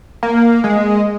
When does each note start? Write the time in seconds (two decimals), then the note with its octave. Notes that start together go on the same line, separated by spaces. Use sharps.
0.23 A#3
0.64 G#3